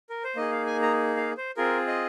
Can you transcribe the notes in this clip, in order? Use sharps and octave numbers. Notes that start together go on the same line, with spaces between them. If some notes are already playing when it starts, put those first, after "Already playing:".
A#4
C5
A#3 D#4 G#4 D#5
F5
G#5
A#5
F5
C5
C4 F4 G#4 A#4
D#5